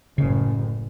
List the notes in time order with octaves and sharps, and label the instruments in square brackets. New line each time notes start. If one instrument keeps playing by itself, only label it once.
[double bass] F#1 A2 [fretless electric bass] C#3